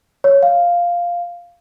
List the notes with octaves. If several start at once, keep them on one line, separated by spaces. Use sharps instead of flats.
C#5
F5